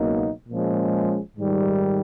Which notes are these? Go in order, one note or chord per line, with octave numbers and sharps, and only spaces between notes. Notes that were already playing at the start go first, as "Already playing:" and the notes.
Already playing: C#2 B2 F#3 A#3 D#4
A#2 F3 G#3 C#4
G#2 D#3 G3